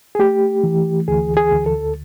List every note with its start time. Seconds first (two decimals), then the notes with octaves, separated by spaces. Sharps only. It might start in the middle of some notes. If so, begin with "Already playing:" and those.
0.15 G#4
0.19 A3 G4
0.63 E3
1.08 D2 G#4
1.37 G#4
1.52 D2
1.66 A4